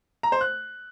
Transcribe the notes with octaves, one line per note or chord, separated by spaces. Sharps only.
A#5
C5
F#6